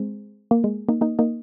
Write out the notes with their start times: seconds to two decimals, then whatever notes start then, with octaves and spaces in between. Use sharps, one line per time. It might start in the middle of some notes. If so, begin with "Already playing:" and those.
Already playing: G#3 C4
0.51 A#3
0.64 G#3
0.89 A#3 D#4
1.01 A#3 D#4
1.19 A#3 D#4